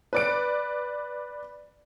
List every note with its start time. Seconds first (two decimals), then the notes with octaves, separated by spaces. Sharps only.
0.13 B4 D5 D7